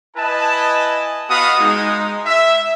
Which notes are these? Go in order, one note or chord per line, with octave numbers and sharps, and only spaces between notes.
E4 B4 D#5 G#5 A5
B3 F#4 D#5 F5 B5 D#6
G#3 D#4
E5